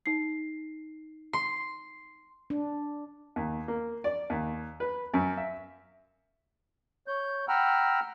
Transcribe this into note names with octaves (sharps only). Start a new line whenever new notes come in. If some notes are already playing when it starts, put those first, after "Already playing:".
D#4 C7
C6
D4
D#2
A#3
D5
D#2
B4
F#2
E5
C#5 G6
F#5 G5 A#5 B5 E6 F6